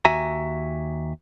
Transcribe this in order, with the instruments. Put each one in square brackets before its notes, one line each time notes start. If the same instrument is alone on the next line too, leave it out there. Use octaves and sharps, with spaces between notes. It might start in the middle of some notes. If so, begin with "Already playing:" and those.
[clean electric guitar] D#2 F#4 E5 G#5 A#5